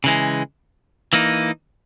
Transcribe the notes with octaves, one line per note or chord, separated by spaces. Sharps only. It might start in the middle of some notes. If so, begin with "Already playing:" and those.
C#3 E3 G#3
E3 A#3 D#4